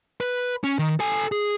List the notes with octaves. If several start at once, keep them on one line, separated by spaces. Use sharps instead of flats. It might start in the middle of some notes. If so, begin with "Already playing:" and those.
B4
C#4
D#3
A4 G#5
G#4